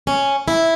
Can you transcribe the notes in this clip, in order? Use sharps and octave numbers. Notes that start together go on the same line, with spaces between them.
C#4
E4